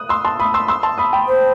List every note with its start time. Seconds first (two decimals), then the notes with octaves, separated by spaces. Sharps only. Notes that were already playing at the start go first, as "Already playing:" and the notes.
Already playing: D#6 F#6
0.09 C6 E6
0.25 A5 C6
0.40 B5 D#6
0.54 C6 E6
0.68 C6 E6
0.83 A5 C6
0.98 B5 D#6
1.13 G5 B5
1.28 C5